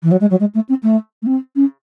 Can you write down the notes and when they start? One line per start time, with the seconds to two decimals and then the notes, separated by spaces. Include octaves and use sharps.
0.03 E3
0.11 F#3
0.21 G#3
0.30 F#3
0.40 G#3
0.55 A3
0.69 C4
0.83 A3
1.22 A3
1.26 C4
1.56 C#4